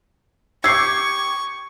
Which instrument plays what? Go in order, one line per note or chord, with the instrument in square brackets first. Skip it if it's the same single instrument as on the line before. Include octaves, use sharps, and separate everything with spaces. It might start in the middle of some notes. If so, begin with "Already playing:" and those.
[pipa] G4 [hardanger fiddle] C#6 [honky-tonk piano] D6 G#6 [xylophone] E6 C7